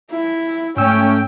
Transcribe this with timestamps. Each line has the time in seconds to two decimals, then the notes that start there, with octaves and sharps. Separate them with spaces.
0.11 E4
0.77 G#2 A3 C#4 G5 E6